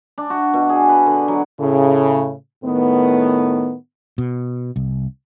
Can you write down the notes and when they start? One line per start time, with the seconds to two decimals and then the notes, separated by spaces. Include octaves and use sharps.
0.18 D4
0.30 F#4
0.53 B2
0.69 G#4
0.89 B4
1.06 D3
1.28 F#3
1.60 A2 C#3
2.64 A2 D#3 B3
4.18 B2
4.76 C2